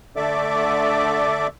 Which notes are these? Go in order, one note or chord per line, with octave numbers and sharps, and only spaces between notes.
D3 A3 A4 D5 E5 D6